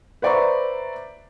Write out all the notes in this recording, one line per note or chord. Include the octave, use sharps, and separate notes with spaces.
B4 C5 D5 E5 A#5 C#6